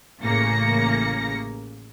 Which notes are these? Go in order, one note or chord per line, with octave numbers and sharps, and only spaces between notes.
A1 C#3 A#3 A#6 C#7